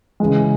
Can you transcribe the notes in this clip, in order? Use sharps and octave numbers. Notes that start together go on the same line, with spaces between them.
C#3 E3 G#3